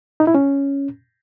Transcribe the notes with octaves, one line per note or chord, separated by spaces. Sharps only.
D#4
E4
C#4